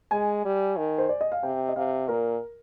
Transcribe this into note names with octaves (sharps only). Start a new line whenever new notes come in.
G#3 G#5
G3
D#3
C5
D5
D#5
F5
C3 G5
D#5
C3 F5
A#2 A#4